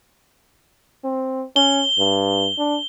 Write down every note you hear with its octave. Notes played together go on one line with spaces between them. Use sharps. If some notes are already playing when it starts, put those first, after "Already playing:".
C4
C#4 G7
G2
D4